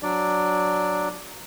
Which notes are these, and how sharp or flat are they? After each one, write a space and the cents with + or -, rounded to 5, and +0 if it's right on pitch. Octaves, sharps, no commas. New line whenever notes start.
F#3 +0 D4 +0 D5 +0